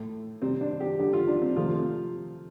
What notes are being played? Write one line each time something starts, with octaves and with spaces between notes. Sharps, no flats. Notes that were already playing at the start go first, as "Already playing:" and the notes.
Already playing: A2 A3
C3 G3 C4
D4
G4
D3 G3 G4
F4
D4
C4
C3 F3 A3 F4